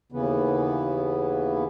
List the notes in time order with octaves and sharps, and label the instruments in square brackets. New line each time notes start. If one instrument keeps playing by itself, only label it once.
[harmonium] D#2 C#3 E3 B3